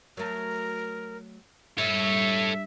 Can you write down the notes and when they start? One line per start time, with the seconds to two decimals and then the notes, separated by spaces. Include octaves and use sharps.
0.17 F#3 A3 A#4
1.78 G2 A4 C#5 E5